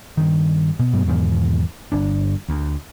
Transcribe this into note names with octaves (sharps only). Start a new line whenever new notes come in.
G2 D#3
B2
G2 B2 F#3 G#3
E2 G#2 B2 D#3
G1 D4
D2